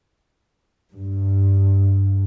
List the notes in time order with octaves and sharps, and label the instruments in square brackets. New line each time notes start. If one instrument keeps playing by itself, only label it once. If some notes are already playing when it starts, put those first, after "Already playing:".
[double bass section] G2